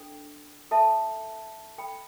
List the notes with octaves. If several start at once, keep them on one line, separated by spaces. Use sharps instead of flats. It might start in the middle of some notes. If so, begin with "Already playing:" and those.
Already playing: D4 A4 G5
A4 E5 A5
A4 G5 B5